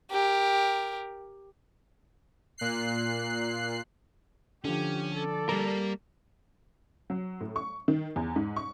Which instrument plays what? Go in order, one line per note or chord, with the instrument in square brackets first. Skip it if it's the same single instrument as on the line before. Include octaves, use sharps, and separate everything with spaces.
[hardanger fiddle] G4 A#4
[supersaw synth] A#2 F#6 C7
[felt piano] D3 F3 [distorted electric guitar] C#4 [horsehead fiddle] G4
[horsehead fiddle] A4 D5
[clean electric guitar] G3 A#4 [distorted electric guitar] A#3
[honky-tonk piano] F#3
A2
C#6
D#3
E2
G#2
C#6